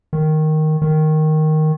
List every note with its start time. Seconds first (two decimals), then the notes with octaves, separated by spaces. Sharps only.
0.13 D#3
0.82 D#3